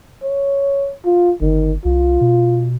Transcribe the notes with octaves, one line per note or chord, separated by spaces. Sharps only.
C#5
F4
G1 D#3
C2 F4
B2